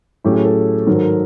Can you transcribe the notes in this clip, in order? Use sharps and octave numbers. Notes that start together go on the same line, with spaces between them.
A2 F#3 A3 C#4 G4
G#4
A4
G#2 D#3 F#3 A#4
A4
A#4